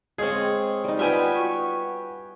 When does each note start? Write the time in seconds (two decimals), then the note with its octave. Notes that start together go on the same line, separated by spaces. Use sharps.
0.18 G#3 C4 G#4 C#5 F5
0.84 G3 D#4
0.99 B3 F4 G4 E5 G5 G#5
1.35 F#4 C#6